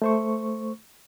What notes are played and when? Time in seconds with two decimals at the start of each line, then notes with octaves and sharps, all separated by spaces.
0.02 A3 C5 C#6